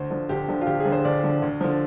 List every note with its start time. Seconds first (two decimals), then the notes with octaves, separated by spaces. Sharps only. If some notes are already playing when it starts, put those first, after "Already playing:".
Already playing: D2 C5
0.10 D3 F3
0.29 D2 G4
0.48 D3 F3
0.61 F4
0.67 D2 G4
0.80 G#4
0.86 D3 F3
0.92 C5
1.04 D2 D5
1.24 D3 F3
1.42 D2
1.61 D3 F3